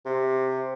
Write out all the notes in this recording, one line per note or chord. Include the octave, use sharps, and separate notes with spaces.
C3